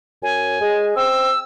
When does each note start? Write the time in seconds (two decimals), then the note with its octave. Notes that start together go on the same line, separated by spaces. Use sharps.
0.23 F#2 G#5
0.61 G#3
0.96 C4 E6